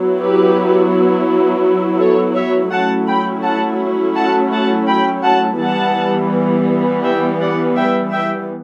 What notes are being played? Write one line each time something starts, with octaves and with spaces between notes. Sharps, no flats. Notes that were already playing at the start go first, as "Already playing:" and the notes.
Already playing: F#3 B3 E4
G4 B4
A4 C#5
C#5 E5
F#3 A3 C#4 E4 F#5 A5
G5 B5
F#5 A5
F#5 A5
F#5 A5
G5 B5
F#5 A5
E3 G3 B3 F#5 A5
E5 G5
D5 F#5
E5 G5
E5 G5